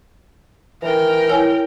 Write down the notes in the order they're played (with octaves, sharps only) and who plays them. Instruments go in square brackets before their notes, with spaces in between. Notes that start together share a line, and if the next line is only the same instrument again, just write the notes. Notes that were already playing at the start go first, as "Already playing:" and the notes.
[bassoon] E3 [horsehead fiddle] A#4 G5
[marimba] E4 C#5 G#5